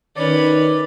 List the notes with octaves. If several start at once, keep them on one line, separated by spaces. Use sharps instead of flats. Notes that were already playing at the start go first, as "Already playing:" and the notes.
D#3 C#4 B4 D5